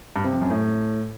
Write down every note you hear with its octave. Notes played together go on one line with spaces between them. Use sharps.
G2
C3
F2
F#2
A2